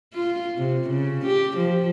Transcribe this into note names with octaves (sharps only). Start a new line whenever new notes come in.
F4
C3
C#3
G4
F3